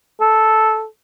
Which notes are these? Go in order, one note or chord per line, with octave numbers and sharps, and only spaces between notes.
A4